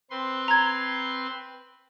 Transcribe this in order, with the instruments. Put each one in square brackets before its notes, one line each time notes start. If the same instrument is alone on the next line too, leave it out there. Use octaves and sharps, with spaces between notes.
[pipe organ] C4 B4 C6
[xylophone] A#5 G#6